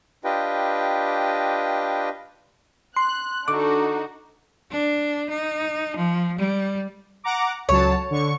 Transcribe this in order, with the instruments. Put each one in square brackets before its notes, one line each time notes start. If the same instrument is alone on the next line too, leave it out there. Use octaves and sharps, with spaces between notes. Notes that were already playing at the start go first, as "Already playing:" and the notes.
[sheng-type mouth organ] D4 F4 G4 B4 D#5 G5
[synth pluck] C6 [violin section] F#6
[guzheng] D3 [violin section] D4 D#4 F#4 [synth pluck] D6
[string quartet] D4
D#4
F3
G3
[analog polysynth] F#5 A#5 D6
[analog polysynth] C#2 F#3 A5 [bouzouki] C#5
[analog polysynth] D3 C#6